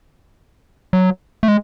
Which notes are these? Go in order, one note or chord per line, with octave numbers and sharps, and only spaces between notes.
F#3
A3
G#3